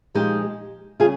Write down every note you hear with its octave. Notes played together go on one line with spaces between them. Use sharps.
A#2 F3 G#3 D#4 G4
C#3 G3 F4 G#4